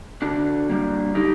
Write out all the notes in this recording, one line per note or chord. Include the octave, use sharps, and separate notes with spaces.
D3 D4 F#4
G3 A#3
D3 D#4 G4